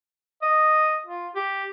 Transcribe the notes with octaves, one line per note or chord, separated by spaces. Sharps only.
D#5
F4
G4